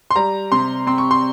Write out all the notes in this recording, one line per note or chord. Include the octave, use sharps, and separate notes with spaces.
C6
G3 A#5
C3 C6
C4 C6
C#6
C6